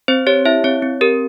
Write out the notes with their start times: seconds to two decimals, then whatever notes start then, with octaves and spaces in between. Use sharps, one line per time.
0.08 C4 C5
0.27 G4 C#5
0.46 E4 E5
0.64 C4 C#5
0.82 C4
1.01 G4 A#4